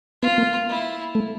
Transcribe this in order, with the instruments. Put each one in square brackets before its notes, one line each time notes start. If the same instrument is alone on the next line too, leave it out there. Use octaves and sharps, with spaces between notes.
[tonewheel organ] B3 [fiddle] F4
[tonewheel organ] A#3
[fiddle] E4
[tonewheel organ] A3